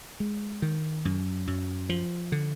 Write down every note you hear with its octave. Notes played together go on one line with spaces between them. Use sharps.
G#3
D#3
F#2
F#2
F3
D3